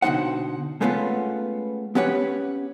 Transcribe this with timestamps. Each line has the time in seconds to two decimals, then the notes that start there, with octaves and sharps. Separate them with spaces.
0.02 B2 D3 E3 D#4 C5 F#5
0.81 G#3 A3 B3 C#4 F4
1.95 B3 C#4 G4 B4 C#5 F#5